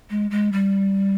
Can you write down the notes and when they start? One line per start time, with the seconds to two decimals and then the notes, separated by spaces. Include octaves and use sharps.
0.10 G#3
0.31 G#3
0.53 G3